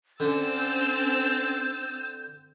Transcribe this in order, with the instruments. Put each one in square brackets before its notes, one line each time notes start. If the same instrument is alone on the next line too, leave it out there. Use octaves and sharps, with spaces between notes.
[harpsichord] D3 [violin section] C4 E6 A6 [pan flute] C#4 [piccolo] G6